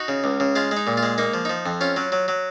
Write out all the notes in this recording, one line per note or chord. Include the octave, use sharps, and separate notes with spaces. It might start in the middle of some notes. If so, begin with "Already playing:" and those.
Already playing: D#4 F#4
C#3
C#2
C#3
G#3 F4
G#3
D#4
A#2
F4
G#3
A#3 D#4
F3
F3 D#4
F2
C#4 F4
F#3
F#3
F#3